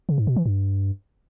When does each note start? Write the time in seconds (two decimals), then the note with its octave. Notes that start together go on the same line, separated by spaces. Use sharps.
0.09 C#3
0.18 G#2
0.27 B2
0.36 E3
0.46 G2